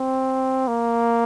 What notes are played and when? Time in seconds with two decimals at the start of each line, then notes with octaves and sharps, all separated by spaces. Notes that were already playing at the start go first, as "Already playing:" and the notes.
Already playing: C4
0.68 A#3